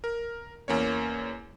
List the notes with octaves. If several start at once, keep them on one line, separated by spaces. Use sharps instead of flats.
A#4
E2 A#3 C#4 C#5